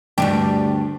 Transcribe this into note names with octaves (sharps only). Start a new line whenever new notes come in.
D2 G2 D4 G4